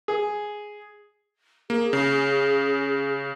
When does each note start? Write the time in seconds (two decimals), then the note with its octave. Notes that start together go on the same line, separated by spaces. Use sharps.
0.08 G#4
1.70 A#3 G#4
1.93 C#3